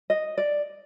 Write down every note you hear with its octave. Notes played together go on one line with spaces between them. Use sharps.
D#5
D5